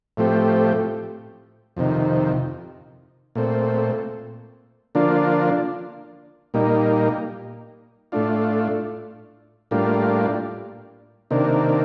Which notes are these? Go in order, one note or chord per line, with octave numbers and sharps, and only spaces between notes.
A2 F3 A3 C4 G4
F2 C3 D#3
A#2 A3 C4
D3 F3 A#3 D4 F4
A#2 G3 A#3 D#4
A2 A3 D4 F4
A2 G3 A#3 D4 F4
C3 D#3 A#3 D4